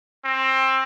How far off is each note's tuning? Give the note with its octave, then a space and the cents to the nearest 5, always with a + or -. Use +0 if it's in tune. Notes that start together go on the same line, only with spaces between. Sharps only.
C4 +20